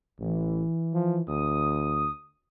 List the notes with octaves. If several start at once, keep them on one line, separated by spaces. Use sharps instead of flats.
A1 E3
F3
D2 D#6